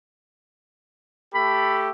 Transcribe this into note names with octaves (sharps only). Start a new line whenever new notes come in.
A3 G4 A4 B5